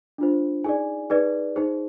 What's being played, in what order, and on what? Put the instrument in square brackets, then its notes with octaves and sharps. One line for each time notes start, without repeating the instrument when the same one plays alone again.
[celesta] D4 F4 C5
D#4 G#4 D5 G#5
D#4 G#4 B4 D5
D#4 G#4 C5